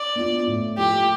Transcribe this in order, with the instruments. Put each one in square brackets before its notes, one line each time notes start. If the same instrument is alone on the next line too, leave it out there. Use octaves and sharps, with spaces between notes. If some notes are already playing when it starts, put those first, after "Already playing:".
Already playing: [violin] D5
[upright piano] B3 D4 F4
A2
[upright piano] F3 A3 E4 [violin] G4